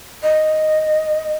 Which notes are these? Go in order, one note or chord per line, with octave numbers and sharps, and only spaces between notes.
D#5